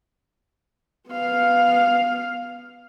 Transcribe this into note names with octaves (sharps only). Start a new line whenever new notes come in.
B3 F5